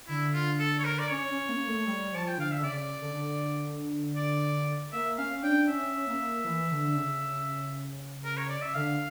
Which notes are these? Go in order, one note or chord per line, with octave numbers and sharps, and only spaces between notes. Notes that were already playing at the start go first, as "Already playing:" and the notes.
D3 E4
F4
A4
C#5
A#4
D5
C#4 C#5
C#4
A#3
A3
G3
F3 A5
G5
D3 F5
E5
D3
C#3 D5
D3
D5
A#3 E5
C#4 F5
D4 G5
C#4 E5
A#3
E3
D3
C#3
A#4
C#5
D5
E5
D3 F5